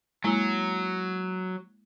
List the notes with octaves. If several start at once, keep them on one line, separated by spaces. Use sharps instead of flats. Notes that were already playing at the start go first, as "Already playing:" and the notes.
F#3 G#3 A#3 E4